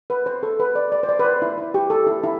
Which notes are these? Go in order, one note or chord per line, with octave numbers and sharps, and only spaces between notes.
B4
C5
A4
B4
D5
D5
C5
D5
B4
C5
E4
E4
G4
A4
E4
E4